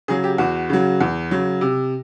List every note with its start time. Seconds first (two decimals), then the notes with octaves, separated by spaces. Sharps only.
0.08 C#3 F#3 G#4
0.24 G4
0.38 E2 F#4
0.70 C#3 F#3
1.00 E2
1.31 C#3 F#3
1.61 C3